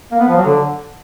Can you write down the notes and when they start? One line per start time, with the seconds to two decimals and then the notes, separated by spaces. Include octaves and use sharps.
0.11 A#3
0.20 B3
0.28 F3
0.37 F#3
0.45 D3